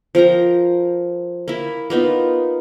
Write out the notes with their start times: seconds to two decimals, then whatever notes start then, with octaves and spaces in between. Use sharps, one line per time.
0.15 F3 A#4 G5 A#5
1.48 A#3 E4
1.90 A#3 B3 D#4 F4